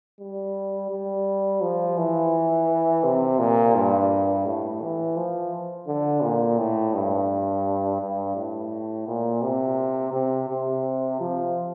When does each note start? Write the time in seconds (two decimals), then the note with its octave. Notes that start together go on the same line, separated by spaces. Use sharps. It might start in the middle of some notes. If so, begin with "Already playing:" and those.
0.20 G3
0.91 G3
1.61 F3
1.98 E3
3.04 C3
3.39 A#2
3.75 G2
4.45 A2
4.81 E3
5.16 F3
5.88 D3
6.22 A#2
6.58 A2
6.94 G2
8.01 G2
8.36 A2
9.08 A#2
9.42 C3
10.13 C3
10.49 C3
11.20 F3